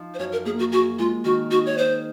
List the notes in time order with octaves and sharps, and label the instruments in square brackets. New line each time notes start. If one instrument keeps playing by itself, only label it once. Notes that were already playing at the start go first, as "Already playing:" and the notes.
Already playing: [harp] F3 D#4
[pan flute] C5
[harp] F#2 [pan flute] C#5
[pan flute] A#4
[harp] A#3 [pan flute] G#4
[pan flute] F#4
[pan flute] F#4 [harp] G#4
[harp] G#3 [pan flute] F4
[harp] D#3 [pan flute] F#4
[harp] D#4 [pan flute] F#4
[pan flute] C#5
[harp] D#4 [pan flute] C5